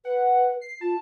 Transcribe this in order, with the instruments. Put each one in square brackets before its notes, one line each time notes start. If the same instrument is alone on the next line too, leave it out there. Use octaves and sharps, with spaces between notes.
[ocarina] B4 [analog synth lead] F#5
[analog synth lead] C7
[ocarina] F4 [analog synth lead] A5